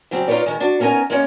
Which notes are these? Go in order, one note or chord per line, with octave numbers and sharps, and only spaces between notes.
C#3 F#3 G3 C4 G4
D#4 F4 G#4 B4 C#5 D5
D#3 G#3
D4 F#4
B3 C#4 D#4 E4 A#4 G#5
G#3 A#3 B3 C#4 C#5